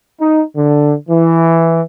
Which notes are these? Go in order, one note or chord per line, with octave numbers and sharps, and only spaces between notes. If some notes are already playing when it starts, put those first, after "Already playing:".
D#4
D3
E3